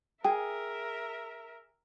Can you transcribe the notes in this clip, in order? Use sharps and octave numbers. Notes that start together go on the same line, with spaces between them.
G#4 A#4 E5 G5